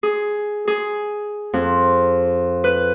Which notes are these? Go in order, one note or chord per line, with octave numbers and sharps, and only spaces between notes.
G#4
G#4
F2
B4